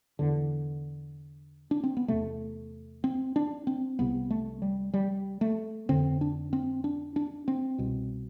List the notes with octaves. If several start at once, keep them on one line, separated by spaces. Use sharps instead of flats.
E2 D3
D4
C4
B3
E2 C3 A3
C4
D4
C4
C2 C3 B3
A3
G3
G3
A3
F2 D3 C4
D4
C4
D4
D4
C4
C2 B2